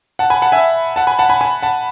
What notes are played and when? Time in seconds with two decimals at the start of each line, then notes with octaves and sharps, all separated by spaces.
0.19 F#5 A5
0.30 G#5 B5
0.42 F#5 A5
0.52 E5 G#5
0.96 F#5 A5
1.07 G#5 B5
1.19 F#5 A5
1.29 G#5 B5
1.41 G#5 B5
1.62 F#5 A5